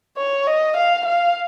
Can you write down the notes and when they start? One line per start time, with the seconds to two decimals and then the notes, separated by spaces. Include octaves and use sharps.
0.17 C#5
0.47 D#5
0.77 F5
1.06 F5